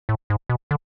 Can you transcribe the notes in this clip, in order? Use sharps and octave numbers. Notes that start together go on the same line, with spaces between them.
A2
G#2
B2
D3